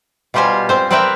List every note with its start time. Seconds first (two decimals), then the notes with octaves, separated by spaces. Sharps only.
0.34 B2 G3 F4 G4 C5 G#5
0.69 C4 C5
0.91 C4 A#4 B4 D5 E5 G5